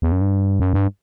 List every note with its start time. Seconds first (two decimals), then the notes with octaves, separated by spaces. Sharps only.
0.02 E2
0.12 F#2
0.21 G2
0.60 F#2
0.73 G2